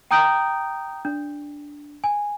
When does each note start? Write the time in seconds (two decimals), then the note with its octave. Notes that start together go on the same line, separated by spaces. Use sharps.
0.11 G5 A#5 D#6 G6 D7
1.05 D4
2.04 G#5